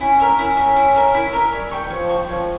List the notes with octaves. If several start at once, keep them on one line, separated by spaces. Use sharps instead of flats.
C#4 E4
A#4 E5
C#4 E4
A#4 E5
E4
A#4 E5
E4
A#4 E5
G3 C#5
G5 C#6
E3
F3 C#5
G5 C#6
F3 C#5